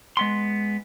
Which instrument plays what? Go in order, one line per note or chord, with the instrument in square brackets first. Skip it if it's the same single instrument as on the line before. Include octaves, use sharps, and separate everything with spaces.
[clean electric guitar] G#3 B3 C6